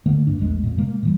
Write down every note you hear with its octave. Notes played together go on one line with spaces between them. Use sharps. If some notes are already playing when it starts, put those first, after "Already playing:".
D3 A3 A#3
G2 D4
A#1 E2 G#3 A3
F2 A#2
C3 G#3 A#3
A#2 E3 G3